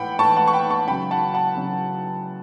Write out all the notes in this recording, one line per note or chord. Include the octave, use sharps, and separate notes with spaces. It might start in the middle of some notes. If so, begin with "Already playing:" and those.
Already playing: A2 E3 F#5 G5 B5
A2 E3 A5 C#6
F#5 A5
C#6
G5 B5
A5 C#6
C#3 F#3 G5 B5
F#5 A5
F#5 A5
C#3 F#3